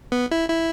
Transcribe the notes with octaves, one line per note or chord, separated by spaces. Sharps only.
B3
E4
E4